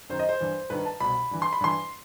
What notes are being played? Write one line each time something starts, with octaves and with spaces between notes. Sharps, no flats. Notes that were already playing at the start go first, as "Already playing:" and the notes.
F#2 D#3 C5
D#5
C5
G2 E3
G2 D#3 B4
A5
C2 B2 B5
G2 E3
C6
B5
G2 E3 C6